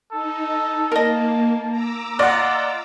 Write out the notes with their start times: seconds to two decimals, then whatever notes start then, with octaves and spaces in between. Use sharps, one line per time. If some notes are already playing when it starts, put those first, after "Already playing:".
0.12 D#4 A4
0.92 A#3 A#4 D#5 A5
1.69 A#5 D6 E6
2.19 F4 D5 D#5 F#5